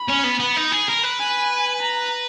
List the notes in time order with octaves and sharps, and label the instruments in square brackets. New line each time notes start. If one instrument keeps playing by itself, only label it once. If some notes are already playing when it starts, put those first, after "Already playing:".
Already playing: [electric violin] B5
[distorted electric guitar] C#4
B3
B3
D#4
G#4
A#4
B4
[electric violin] G#5
A#5